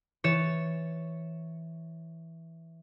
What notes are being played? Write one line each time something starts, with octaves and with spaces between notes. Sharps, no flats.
E3 C#5 A6 C#7 E7